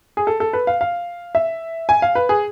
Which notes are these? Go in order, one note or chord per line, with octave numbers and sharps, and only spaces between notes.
G#4
A4
A4
B4
F5
F5
E5
G#5
F5
B4
G#4